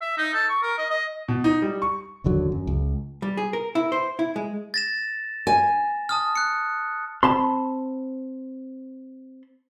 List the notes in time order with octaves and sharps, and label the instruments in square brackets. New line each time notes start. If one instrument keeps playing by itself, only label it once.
[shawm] E5
D#4
A4
C#6
A#4
D#5
D#5
[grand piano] B2
D#4
G3
C#6
[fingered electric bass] F#1 D#2 D3 F#3
F#2
C#2
[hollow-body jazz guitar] G3
G#4
A#4
E4
C5
E4
G#3
[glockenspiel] A6 A#6 E7
[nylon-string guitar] G#5
[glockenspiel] A5 D#6 F6
F#6 C#7
[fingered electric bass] C4 [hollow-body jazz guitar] A5 B5 C6